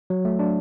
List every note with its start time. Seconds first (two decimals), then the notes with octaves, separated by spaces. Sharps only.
0.10 F#3
0.25 A3
0.39 D4